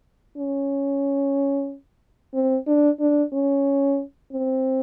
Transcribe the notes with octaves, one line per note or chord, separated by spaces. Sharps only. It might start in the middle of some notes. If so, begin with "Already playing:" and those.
C#4
C4
D4
D4
C#4
C4